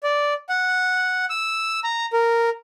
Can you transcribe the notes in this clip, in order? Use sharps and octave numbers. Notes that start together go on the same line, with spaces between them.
D5
F#5
E6
A#5
A#4